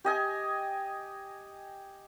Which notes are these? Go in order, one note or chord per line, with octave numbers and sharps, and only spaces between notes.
G4 D#5 G#5